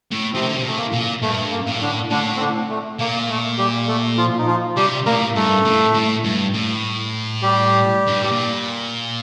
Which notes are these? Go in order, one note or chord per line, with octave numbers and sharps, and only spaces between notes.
A2
C3 F3 C4
D#3
D3
C3
A#2 A3
A#3
A#2
G2 A3
A#3
A2
D3 D4
A2 D3 D4
C4
D3 D4
A3
A#2 A#3
A3
G3 G4
A3 A4
F3 F4
D#4
F3 F4
C3 G3 G4
A2 A#3 A#4
G2 A3 A4
A2
A2
G2
A2
G3 G4
G2
A2
A#2